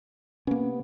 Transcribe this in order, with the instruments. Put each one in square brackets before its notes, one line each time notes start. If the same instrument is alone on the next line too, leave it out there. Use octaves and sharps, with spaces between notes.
[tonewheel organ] C3 B3 [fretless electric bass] A#3 C#4